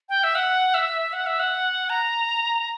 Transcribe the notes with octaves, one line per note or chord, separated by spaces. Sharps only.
G5
E5
F#5
E5
F#5
E5
F#5
A#5